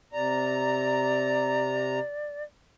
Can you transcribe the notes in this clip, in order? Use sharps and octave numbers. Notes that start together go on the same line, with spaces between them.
C3 D5 A#5